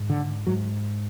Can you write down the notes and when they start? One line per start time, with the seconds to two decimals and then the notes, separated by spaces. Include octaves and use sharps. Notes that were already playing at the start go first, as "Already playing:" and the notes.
Already playing: G#2
0.10 D3
0.47 G#2 F#3